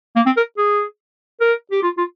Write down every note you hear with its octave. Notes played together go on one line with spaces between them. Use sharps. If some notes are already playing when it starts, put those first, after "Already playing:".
A#3
C4
A#4
G#4
A#4
G4
F4
F4